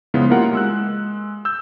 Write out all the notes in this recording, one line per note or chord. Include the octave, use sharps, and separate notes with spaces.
C#3 F3 G#3 B3 E4 F4
A#3 E4 F4 G4 A#4 F#5
G#3 E6 F#6
E6 G6